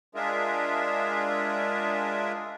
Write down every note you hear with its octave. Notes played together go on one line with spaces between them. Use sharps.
G#3 D4 F4 G#4 A#4 E5